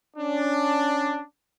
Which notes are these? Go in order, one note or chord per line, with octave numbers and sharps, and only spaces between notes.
C#4 D4